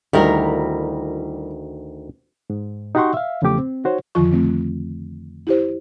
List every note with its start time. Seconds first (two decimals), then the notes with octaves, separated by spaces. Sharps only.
0.13 D2 D#3 G3 E4 A#4
2.50 G#2
2.95 D#4 F#4 G4 F#5 C6 C#6
3.14 E5 F5
3.42 E2 C#3 F3 A3 G4 D6
3.59 C4
3.84 D#4 F#4 C5 C#5
4.15 F2 D3 D#3 F3 F4 C#6
4.33 A3 C4
5.47 E4 G4 C5